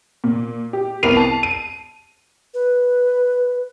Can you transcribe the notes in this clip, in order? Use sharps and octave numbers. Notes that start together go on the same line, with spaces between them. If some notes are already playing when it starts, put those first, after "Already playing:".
A#2
G4
C2 B3 A#4 C7 D#7 F7
A5
D#7
B4